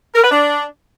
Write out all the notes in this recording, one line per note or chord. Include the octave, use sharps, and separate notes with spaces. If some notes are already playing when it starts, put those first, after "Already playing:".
A#4
B4
D4